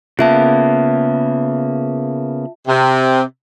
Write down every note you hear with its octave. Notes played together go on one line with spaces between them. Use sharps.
C#3 A#3 B3 F4 E5 A5
C3